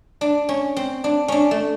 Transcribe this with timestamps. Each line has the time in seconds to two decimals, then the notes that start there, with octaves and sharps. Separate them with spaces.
0.21 D4
0.49 C#4
0.76 C4
1.04 D4
1.28 C#4 D4
1.51 A3